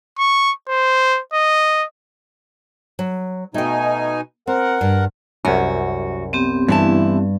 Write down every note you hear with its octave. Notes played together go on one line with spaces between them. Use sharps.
C#6
C5
D#5
F#3
B2 A3 D#4 G5 G#5
C4 A#4 F#5
G2
C2 F#2 F#4
B3 C4 G4
G2 E3 E4 A5